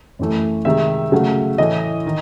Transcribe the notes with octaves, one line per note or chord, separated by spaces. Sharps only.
F#2 E3 A3
C3 D#3 G#3 E5
C#3 F#3 A3
A2 E3 A3 D#5
D#3